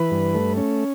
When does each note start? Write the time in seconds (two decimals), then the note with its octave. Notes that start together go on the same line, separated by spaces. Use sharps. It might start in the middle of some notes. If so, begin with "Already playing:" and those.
Already playing: E3 B4
0.11 G2
0.35 A3
0.57 C#4